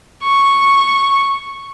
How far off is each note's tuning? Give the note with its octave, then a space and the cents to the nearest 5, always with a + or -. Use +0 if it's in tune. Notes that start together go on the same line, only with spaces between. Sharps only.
C#6 -5